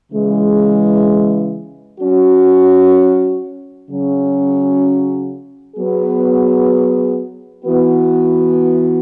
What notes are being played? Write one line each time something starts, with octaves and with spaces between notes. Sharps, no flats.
C#3 E3 G#3
F#3 C#4 F#4
C#3 F#3 C#4
F#3 B3 G#4
E3 B3 F#4